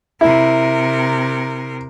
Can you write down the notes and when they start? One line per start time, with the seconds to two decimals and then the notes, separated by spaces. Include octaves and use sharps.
0.21 C3 E4 A#4